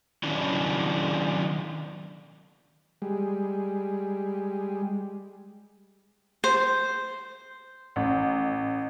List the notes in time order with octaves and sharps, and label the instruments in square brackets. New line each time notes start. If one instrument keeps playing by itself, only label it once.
[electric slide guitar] D#3 F#3 C#4 D4 E4
[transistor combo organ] G3 G#3
[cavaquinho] C5
[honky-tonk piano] A1